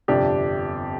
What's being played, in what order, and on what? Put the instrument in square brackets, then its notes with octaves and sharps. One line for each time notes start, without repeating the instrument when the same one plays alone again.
[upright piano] G1 F2 C3 D4 G4